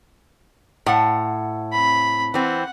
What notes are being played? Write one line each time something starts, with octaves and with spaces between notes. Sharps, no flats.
A2 F#5
C4 B5
E3 C4 F#5